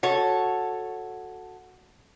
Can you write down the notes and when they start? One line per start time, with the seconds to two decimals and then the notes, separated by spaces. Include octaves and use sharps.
0.03 F#4 A4 C#5